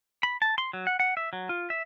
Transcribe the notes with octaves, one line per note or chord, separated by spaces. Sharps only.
B5
A5
C6
F#3
F#5
F#5
E5
F#3
F4
E5